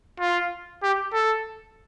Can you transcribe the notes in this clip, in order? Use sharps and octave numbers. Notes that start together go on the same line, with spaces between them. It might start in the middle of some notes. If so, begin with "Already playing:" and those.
F4
G4
A4